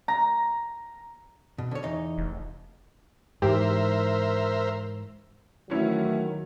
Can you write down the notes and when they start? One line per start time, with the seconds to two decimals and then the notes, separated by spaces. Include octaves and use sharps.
0.08 A#5
1.58 B2
1.71 D3 C#5
1.83 E2 D#4
2.18 F1
3.42 G#2 E3 G4 A#4 C5 E5
5.70 D#3 E3 F#3 A3 C#4 E4